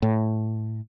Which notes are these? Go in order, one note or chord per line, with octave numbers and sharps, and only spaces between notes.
A2